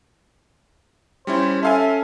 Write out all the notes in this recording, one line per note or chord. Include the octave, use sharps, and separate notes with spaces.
G3 C#4 E4 C5
C#4 A4 E5 F5 G#5